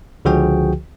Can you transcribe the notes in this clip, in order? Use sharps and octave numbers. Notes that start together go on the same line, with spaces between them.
C#2 D3 F3 F#4 G#4 G5